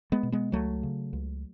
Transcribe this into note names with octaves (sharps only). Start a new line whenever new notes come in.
G#3 B3
B2
G#3 B3
C#2 F#3 A3
C#3
C#2